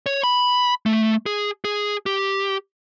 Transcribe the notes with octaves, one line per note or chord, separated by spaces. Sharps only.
C#5
B5
A3
G#4
G#4
G4